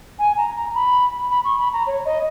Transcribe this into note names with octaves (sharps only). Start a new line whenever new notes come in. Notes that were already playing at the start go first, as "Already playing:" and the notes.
G#5
A#5
A#5
B5
B5
C#6
B5
A#5
C#5
D#5